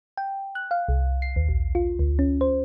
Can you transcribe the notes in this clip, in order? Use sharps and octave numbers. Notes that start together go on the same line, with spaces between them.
G5
F#6
F5
C2
C7
D#2
A#1
F4
D2
C#4
C5